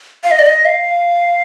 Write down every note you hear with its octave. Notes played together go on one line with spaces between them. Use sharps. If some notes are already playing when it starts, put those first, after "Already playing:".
F5
D#5
D5
D#5
F5